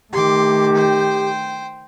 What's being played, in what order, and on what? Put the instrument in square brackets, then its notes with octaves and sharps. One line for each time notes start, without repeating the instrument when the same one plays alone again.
[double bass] D#3 A3 [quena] G4 [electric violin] C6 D6
[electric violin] C5 G5